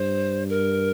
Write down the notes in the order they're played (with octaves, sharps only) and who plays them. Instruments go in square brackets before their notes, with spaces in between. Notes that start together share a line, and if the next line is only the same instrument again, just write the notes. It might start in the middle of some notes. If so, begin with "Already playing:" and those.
Already playing: [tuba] G2 [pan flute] C5
[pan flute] A#4